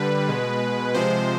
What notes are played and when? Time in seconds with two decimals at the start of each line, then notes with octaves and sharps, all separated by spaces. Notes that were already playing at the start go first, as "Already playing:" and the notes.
Already playing: D3 G3 B4
0.28 B2 G#3
0.94 C3 F3 G#3 C5